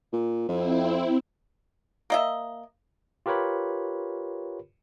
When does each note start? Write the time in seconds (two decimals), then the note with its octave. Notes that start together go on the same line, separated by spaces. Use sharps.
0.12 A#2
0.48 F2 C4 E4
2.10 A#3 D#5 E5
3.26 F4 G4 A#4 B4 C#5 B5